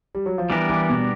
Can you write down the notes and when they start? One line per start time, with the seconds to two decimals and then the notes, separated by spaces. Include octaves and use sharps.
0.15 G3
0.26 F#3
0.38 F3
0.50 E3 G3 B3 D4 G4 A#4
0.69 E3
0.89 B2